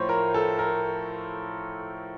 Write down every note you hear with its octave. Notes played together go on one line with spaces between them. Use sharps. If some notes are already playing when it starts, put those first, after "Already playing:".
Already playing: A2 F3 C5 C#5
A#4
A4
A#4